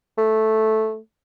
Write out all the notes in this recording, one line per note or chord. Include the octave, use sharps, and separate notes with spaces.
A3